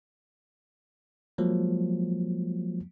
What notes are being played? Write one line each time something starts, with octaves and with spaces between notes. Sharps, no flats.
F3 F#3 G#3 A#3